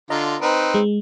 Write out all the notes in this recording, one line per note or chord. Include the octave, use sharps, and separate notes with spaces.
D3 F4 D#5 A#5
C4 D#4 B4
G#3